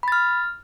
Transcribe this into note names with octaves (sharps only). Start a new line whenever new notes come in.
B5 F6 A6